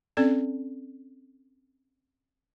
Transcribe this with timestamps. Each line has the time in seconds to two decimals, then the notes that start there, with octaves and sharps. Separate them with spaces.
0.17 C4 C#4 A4 D5